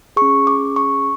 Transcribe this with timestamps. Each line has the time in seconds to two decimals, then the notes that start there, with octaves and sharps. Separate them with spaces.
0.16 G#4 C#6
0.22 C#4
0.47 D6
0.76 C#6